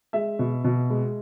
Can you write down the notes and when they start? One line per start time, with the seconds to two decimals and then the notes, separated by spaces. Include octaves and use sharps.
0.13 G#3 E5
0.39 B2
0.64 B2
0.90 G#3